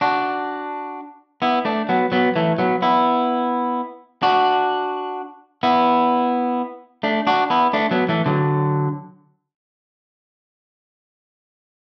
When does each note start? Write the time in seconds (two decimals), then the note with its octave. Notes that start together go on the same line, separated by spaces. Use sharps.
0.01 D4 F#4
1.42 B3 E4
1.65 A3 D4
1.89 F#3 B3
2.12 F#3 B3
2.36 E3 A3
2.58 F#3 B3
2.82 B3 E4
4.23 D4 F#4
5.63 B3 E4
7.03 A3 D4
7.27 D4 F#4
7.50 B3 E4
7.73 A3 D4
7.91 F#3 B3
8.09 E3 A3
8.26 D3 F#3